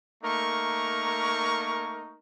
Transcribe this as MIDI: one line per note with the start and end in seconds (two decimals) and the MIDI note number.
0.24 2.17 57
0.24 2.17 58
0.24 2.17 63
0.24 2.17 70
0.24 2.17 85